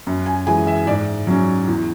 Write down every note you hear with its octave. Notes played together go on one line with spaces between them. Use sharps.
F#2
G#5
E3 G#3 G#5
E5
G#2 D5
F#3 C#4
E2